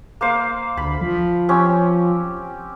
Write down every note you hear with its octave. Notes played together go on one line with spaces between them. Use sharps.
A#3 C5 F5
D2 B5
F3
C4 C#4 G4